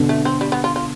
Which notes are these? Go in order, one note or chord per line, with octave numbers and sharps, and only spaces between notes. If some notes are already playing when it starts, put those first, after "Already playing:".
Already playing: B2 D3
A3
C4
G3
B3
F4
F4